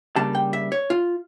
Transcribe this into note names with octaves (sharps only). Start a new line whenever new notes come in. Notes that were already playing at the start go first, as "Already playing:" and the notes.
C#3 G3 A#3 D4 A5
G5
E5
C#5
F4